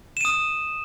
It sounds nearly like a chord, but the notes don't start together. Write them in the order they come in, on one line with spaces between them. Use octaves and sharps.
E7 D#7 D#6